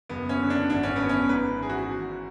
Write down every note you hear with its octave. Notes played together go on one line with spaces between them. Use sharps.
F#1 B3
C#4
D3
D4
G#1 D4
C#4
G#1 B3
C#4
G#2 B4
E3 G#4
F#4
G#1